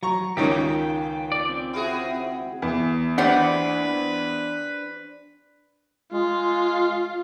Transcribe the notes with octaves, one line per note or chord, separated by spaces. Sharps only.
F#3 A#5 C#6
C#2 A#2 D#3 F#3 C#4 D#4 G4 C#5
A#3 G5
D5
C4
E4 F#4 G#4
E2
E3 D4 G4 B4 C5 D5 F#5
G#3 F4